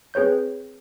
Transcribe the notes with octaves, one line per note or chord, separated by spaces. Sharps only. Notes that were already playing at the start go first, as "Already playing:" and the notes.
C4 G#4 B4 C#5 G6